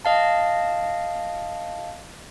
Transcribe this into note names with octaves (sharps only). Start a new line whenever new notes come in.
D#5 F5 A5